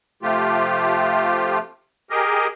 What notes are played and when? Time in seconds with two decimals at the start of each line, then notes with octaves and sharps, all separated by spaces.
0.22 C3 F3 A3 F4 G4
2.10 G4 G#4 A#4 D#5